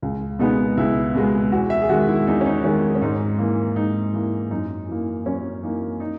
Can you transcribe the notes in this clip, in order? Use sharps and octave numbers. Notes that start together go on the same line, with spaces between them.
C#2
B2 G#3 B3 D#4
C#2 E4
B2 G#3 B3
E2 F#4
E5
G#4
D#3 G#3 F#4
E4
E2 D#4
C#4
D#4
D#3 G#3 C#4
C#4
G#2 D#4
E3 A#3
G#2 D#4
E3 A#3
F#2 D#4
E3 A#3
F#2 C#4
E3 A#3 D#4
D#4